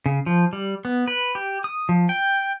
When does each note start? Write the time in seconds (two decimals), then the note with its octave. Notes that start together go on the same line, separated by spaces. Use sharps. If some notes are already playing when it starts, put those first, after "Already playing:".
0.06 C#3
0.26 F3
0.53 G3
0.85 B3
1.08 B4
1.35 G4
1.64 D#6
1.89 F3
2.09 G5